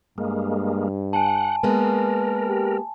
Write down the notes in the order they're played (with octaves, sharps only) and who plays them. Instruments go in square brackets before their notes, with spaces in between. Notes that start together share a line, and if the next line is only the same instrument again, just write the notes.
[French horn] G2 [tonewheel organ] G#3 A#3
[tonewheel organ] F#5 [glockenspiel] G#5 A5
[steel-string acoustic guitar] G#3 A#3 B3 [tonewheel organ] A#4
[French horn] G4